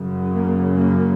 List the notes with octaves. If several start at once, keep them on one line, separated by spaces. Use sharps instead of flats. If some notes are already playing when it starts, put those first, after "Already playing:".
Already playing: F#2 C#3
A#3
A#3